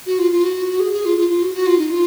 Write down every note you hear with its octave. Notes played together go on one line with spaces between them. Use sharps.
F#4
F4
F4
F#4
G#4
G#4
F4
F4
F4
F#4
F#4
F4
D#4
F4